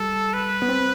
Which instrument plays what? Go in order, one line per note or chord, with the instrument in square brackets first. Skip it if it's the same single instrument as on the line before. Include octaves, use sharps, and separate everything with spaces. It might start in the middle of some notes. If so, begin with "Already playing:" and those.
Already playing: [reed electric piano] G3 [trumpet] A4
[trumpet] B4
[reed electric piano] B3
C4